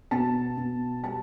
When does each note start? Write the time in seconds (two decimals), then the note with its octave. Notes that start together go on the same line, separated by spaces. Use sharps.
0.11 B2 A5
0.57 B2
1.03 G3 A5